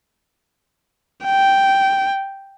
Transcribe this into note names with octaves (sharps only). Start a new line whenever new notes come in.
G5